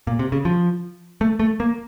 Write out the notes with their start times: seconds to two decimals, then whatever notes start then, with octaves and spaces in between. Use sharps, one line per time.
0.07 A#2
0.19 C3
0.32 C#3
0.45 F3
1.21 A3
1.40 A3
1.60 A#3